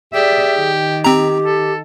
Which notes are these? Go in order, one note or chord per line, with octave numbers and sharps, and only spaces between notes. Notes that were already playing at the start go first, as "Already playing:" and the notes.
G4 G#4 D5 E5
D#3
C4 G4 A#5
A4